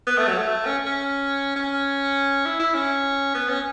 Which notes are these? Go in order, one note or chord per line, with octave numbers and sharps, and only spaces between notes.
B3
A3
F#3
A3
C#4
C#4
C#4
E4
E4
C#4
B3
C#4